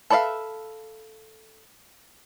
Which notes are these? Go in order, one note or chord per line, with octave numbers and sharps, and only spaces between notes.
A4 B4 D5 E5 F5